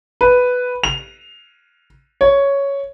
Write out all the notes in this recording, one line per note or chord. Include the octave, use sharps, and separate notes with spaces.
B4
F7
C#5